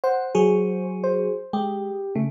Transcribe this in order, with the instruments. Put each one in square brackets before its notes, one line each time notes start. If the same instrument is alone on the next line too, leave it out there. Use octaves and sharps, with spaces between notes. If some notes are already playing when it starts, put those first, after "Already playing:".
[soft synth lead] C5 [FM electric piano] F#5
[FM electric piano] F#3 F#4 G#4
[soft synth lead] C5
[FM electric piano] G#3 [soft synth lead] G4
[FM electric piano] C#3 [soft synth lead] A3